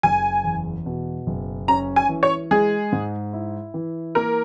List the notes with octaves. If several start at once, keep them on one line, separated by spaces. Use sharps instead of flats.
F#1 G#5
E2
B2
F#1
C#4 A#5
G#5
E3
C#5
G#3 G#4
G#2
E4
E3
A#3 A#4